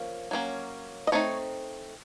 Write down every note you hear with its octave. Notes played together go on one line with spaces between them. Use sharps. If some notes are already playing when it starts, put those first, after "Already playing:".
Already playing: F3 A#3 C#4
F#3 A#3 C#4
D#5
A3 C4 D#4 C#5